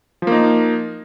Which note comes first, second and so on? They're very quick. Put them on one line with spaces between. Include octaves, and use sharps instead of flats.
F3 A#3 D#4